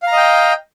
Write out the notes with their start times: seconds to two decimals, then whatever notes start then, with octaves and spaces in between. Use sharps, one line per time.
0.02 F5
0.07 A#5
0.12 D#5
0.17 G5